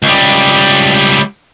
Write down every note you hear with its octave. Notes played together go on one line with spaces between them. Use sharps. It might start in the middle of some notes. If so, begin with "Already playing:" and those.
C#2 G3